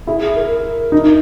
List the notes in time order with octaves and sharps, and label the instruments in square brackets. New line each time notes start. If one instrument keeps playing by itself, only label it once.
[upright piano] E4 [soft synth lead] G#4
[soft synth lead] G#4
A#4
[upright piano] D#4